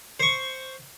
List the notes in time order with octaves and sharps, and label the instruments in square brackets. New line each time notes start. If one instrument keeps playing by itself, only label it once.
[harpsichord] C5 C#6